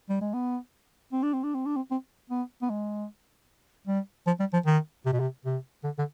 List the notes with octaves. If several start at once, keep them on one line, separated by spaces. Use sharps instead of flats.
G3
G#3
B3
C4
D4
C4
D4
C4
D4
C4
C4
B3
B3
G#3
G3
F3
G3
F3
D#3
C3
B2
C3
C3
D3
D3